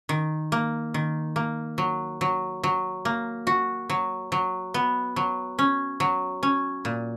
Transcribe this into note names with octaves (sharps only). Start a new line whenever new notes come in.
D#3
A#3
D#3
A#3
F#3
F#3
F#3
A#3
F#4
F#3
F#3
B3
F#3
C#4
F#3
C#4
A#2